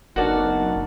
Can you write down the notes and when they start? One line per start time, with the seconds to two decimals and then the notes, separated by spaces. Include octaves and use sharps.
0.16 F#1 B1 D4 D#4 F#4 A#4 D5 F#5